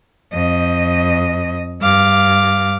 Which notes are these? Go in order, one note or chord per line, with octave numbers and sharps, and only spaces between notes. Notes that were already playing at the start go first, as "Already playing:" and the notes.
F2 D#5
G2 F5 D6